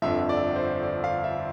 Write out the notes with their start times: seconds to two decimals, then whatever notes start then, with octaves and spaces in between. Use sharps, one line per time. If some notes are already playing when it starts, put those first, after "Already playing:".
0.02 G1 F2 D3 F3 E5
0.29 D5
0.56 C5
0.83 D5
1.04 F5
1.24 E5